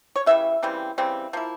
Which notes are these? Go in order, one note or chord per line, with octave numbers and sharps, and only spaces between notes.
C#5
C#3 E3 G3 E5
C#3 E3 G3 C4
C#3 E3 G3 C4
F3 A#3 E4